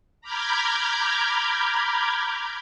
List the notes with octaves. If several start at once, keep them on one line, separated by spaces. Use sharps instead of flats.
A#5 B5 D6 F6 G6 G#6